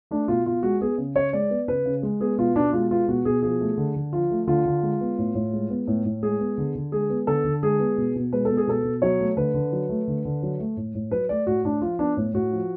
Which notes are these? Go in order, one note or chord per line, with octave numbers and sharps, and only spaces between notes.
A3 D4
B2 F4
B2 F4
G#3 F#4
B3 G#4
C#3
C#3 C#5
G#3 D5
B3
C#3 B4
C#3
G#3
B3 G#4
B2 F4
B2 D4
G#3 F4
B3 F4
B2 F#4
B2 G#4
F3 G#4
A3
D3
D3
F3 F4
A3
D3 F4
D3
G#3
B3
A2
A2
G#3
B3
A2
A2
G#3 G#4
B3
D3
D3
G#3 G#4
B3
D3 A4
D3
G#3 G#4
B3
B2
B2
G#3 B4
B3 A4
G#4
B2 A4
B2
F#3 C#5
A3
D3 B4
D3
F#3
A3
D3
D3
F#3
A3
A2
A2
F#3 B4
A3 D5
A2 F#4
A2 D4
F3 F4
B3 D4
A2
A2 F#4
F3